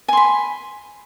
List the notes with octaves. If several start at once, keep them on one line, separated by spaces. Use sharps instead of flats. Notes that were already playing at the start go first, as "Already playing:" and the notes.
G#5 B5 C6